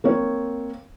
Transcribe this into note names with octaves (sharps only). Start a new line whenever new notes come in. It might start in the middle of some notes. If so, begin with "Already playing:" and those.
A#3 C4 C#5